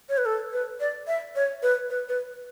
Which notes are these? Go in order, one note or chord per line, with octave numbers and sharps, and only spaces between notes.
C#5
B4
A4
B4
D5
E5
C#5
B4
B4
B4